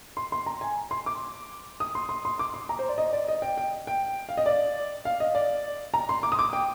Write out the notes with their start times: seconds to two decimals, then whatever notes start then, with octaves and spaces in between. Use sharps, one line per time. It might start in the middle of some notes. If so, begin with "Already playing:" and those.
0.17 C6
0.32 C6
0.46 A#5
0.61 G#5
0.91 C6
1.06 D6
1.80 D#6
1.95 C6
2.09 C6
2.25 C6
2.39 D6
2.54 C6
2.69 A#5
2.79 C5
2.89 D5
2.98 D#5
3.13 D5
3.28 D#5
3.42 G5
3.58 G5
3.87 G5
4.29 F5
4.37 D#5
4.46 D5
5.05 F5
5.20 D#5
5.35 D5
5.94 A#5
6.09 C6
6.23 D6
6.32 D#6
6.39 D6
6.53 G5